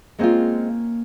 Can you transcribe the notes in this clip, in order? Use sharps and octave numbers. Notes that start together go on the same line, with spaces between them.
G#3 A#3 C4 C#4 F4